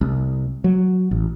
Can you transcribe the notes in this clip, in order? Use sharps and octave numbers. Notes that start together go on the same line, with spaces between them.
C2
F#3
A1